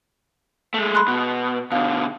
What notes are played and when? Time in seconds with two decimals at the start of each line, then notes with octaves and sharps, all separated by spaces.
0.74 G#3 A3
0.95 B5 C6 F#6
1.08 B2
1.72 B2 D3 F5